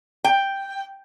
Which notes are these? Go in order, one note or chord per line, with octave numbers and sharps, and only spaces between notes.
G5